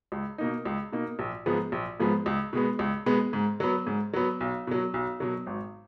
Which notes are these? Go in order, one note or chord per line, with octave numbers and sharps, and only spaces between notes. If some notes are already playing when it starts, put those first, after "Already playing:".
C#2
B2 A#3 D#4
C#2
B2 A#3 D#4
A#1
G#2 F3 G#3 B3
A#1
G#2 F3 G#3 B3
C#2
B2 G#3 B3
C#2
B2 G#3 B3
G#2
F#3 B3
G#2
F#3 B3
B1
B2 F#3
B1
B2 F#3
G#1